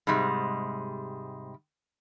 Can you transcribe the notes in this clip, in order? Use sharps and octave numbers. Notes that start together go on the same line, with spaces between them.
G#2 C3 G3 G#3